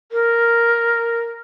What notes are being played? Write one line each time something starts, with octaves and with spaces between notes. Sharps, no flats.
A#4